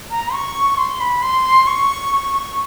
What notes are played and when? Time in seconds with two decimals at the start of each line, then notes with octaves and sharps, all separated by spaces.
0.11 A#5
0.33 C#6
0.78 C6
1.00 B5
1.22 C6
1.67 C#6